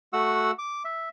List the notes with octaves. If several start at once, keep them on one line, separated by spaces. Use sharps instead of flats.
A3 F#4 F#5 E6
D6
E5